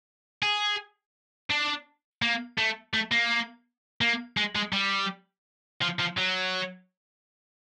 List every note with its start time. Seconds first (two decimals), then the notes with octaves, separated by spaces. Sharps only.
0.43 G#4
1.50 D4
2.22 A#3
2.58 A3
2.94 A3
3.11 A#3
4.01 A#3
4.37 G#3
4.56 G#3
4.73 G3
5.81 F3
5.99 F3
6.17 F#3